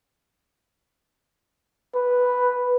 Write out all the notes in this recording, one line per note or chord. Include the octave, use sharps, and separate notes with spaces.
B4